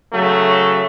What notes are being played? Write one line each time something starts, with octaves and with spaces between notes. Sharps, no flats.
C#3 F#3 A3